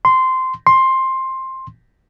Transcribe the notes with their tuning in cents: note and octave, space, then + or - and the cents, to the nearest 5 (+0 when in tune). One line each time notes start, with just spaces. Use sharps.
C6 -10
C6 +15